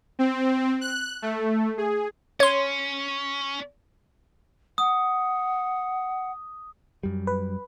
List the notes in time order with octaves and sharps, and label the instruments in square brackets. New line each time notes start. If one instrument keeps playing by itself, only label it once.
[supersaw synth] C4
F#6
A3
G#4
[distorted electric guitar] C#4 [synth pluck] C#5 C6
[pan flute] F#5 [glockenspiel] D#6
[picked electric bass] F#2 G3
[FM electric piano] B4